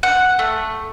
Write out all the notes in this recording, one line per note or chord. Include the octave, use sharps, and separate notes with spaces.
F#5
A3